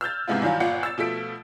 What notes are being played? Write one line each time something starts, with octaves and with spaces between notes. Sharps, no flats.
E6 F6 G6 A6
G#2 C3 G#3 B3 E4 F4
G2 D#3 E3 F#3 F4
G1 A#2 F4 F#5 C#7
E6 A6
B2 F3 A3 B6 D7